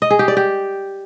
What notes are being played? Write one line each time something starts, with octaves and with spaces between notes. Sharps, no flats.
D#5
G#4
G4
D5
G4